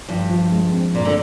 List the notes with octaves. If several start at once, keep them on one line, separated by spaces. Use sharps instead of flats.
G2 F3
F3
G#3
C4
G2 A#2
D3